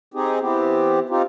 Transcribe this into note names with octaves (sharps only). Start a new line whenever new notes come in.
C4 D#4 G4 G#4
E3 B3 C4 G4
C4 D#4 F4 G4